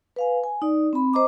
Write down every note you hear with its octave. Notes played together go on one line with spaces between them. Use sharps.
B4 F5 G#5
G#5
D#4 D5
C4 B5
C5 D#5 A#5 D6